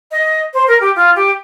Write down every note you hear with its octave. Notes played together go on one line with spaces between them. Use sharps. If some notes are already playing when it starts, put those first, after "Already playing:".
D#5
C5
A#4
G4
F4
G4